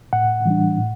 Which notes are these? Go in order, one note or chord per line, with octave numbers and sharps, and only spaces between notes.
A2 F#5
E3 G3 D4
A2